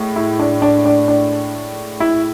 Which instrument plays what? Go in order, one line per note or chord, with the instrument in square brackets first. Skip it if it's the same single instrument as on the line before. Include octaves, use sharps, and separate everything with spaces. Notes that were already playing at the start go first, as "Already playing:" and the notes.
Already playing: [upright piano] A2 G#3
[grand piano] E4
D4
D4
D4
D4
E4